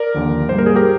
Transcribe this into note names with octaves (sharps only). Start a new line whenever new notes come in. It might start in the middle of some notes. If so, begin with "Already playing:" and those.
Already playing: A#4 D5
D#2 D3 F3
G#2 G3 A#3 C5
A#4
G#4
G4 A#4